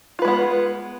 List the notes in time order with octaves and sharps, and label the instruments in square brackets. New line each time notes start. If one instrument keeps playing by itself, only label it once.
[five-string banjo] F4
B4
G#3
B3